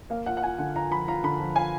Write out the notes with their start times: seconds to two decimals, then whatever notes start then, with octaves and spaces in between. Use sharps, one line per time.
0.10 A#3 F5
0.26 F4 F#5
0.37 F#5
0.42 F4 G#5
0.58 D3 F#5
0.76 F4 A#5
0.91 F3 B5
1.08 F4 A#5
1.24 D3 B5
1.40 F3
1.55 F4 G#5